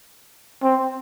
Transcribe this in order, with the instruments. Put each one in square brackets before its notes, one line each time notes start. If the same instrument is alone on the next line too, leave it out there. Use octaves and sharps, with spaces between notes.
[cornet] C4